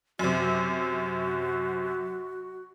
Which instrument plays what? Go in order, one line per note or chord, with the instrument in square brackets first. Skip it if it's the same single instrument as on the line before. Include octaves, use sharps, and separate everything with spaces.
[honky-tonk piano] F#2 C3 [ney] F#4